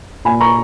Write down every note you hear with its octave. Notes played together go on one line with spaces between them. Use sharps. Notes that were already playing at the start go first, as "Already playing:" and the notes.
A#2 G#5 B5
A#5 C#6